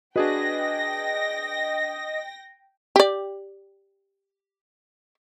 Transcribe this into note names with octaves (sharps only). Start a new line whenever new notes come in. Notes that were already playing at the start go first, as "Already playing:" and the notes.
D4 F#4 G#4 B4 D#5 G5 A#6
G4 D5